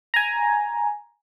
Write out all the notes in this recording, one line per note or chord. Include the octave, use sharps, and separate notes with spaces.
G#5 A#5